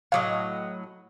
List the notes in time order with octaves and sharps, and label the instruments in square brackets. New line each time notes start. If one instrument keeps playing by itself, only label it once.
[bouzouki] A2 F#3 D#5 [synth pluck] F5 D6